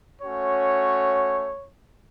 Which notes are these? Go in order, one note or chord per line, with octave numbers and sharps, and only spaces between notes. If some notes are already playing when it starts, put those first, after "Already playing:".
A3 C#4 F#4 C#5